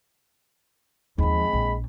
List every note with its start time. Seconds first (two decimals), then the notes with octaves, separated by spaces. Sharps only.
1.18 D#2 F3 G#3 C4 B5
1.53 A#1